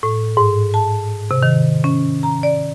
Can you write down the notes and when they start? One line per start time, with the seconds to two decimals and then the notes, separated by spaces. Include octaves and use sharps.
0.03 A2
0.37 G#2
0.74 A5
1.31 C3
1.43 D#3
1.84 C#4
2.23 A#5
2.43 D5